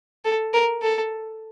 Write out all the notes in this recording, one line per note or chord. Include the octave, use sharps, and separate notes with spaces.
A4
A#4
A4